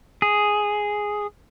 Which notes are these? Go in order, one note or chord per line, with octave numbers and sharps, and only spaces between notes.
G#4